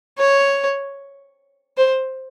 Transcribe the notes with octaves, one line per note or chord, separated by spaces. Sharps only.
C#5
C5